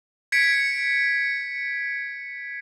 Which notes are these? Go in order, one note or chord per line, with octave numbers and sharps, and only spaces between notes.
G#6 B6 C#7 D7